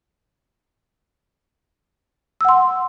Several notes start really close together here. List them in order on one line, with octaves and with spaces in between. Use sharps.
E6 F#5 C6